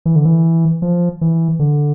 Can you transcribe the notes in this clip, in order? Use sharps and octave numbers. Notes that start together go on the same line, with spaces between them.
E3
D3
E3
F3
E3
D3